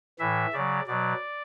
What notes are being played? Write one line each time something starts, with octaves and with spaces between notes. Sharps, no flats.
A2 E3 E5
C#3 F#3 D5
B2 F#3 D5